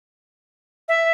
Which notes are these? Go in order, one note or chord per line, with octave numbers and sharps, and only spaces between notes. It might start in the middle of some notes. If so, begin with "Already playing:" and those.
E5